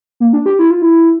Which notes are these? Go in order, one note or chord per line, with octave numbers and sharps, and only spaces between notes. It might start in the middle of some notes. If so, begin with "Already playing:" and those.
A#3
D4
G4
E4
F4
E4